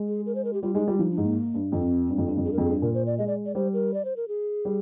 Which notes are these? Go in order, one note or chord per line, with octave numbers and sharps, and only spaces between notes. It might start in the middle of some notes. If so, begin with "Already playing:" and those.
Already playing: G#3
G#4
A#4
C5
A#4
G4
G3 F4
G#3 D#4
G3 F4
F3 D#4
D4
G#2
A#3
G2
F2 C4
G2
F2
G2
F2
G2 G#4
A#4
F2 G#4
G2
A#2 A#4
C5
D5
G#3 D#5
D5
D5
G3 C5
A#4
D5
C5
A#4
G#4
G3